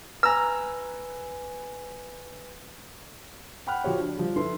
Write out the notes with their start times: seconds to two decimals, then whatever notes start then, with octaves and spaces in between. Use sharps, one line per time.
0.23 B4 G#5 A#5 E6
3.67 F#5 G5 B5 F6 F#6
3.84 F3 F#4 G4 C#5
3.98 D4
4.18 F3 G3
4.36 E4 A4 B4 C6